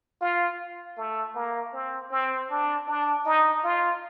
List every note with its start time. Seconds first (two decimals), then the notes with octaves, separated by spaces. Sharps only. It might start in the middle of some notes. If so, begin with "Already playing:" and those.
0.21 F4
0.97 A3
1.35 A#3
1.73 C4
2.11 C4
2.50 D4
2.88 D4
3.26 D#4
3.64 F4